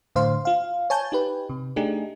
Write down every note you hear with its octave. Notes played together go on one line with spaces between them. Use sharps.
A2 D3 C5 F5 C6
F4 F5
C#5 G#5 A5 G6
D#4 G4 B4
C3
A3 D4 D#4 G4 G#4